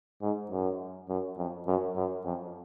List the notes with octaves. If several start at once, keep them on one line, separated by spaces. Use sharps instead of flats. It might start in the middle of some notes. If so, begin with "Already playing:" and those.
G#2
F#2
F#2
F2
F#2
F#2
F2